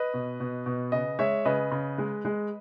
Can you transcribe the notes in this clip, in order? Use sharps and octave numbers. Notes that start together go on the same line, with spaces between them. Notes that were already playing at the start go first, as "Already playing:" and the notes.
Already playing: B4 D#5
B2
B2
B2
C#3 B4 D#5
G#3 C#5 E5
C#3 B4 D#5
C#3
G#3
G#3